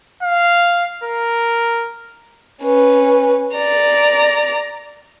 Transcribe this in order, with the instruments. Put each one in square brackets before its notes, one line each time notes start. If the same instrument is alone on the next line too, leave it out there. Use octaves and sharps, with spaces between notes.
[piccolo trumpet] F5
A#4
[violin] C#4 B4
D5 A#5